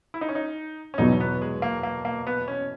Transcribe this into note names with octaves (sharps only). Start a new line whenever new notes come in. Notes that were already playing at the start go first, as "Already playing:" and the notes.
E4
D#4
C#4
D#4
C#4
E2 B2 F#3 D#4
B3
G#3
A#3
A#3
A#3
B3
C#4